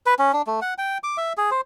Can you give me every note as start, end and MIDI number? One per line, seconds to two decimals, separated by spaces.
0.06 0.14 71
0.19 0.32 61
0.33 0.42 62
0.47 0.60 57
0.62 0.74 78
0.78 0.98 79
1.03 1.17 86
1.17 1.33 76
1.37 1.50 68
1.51 1.61 72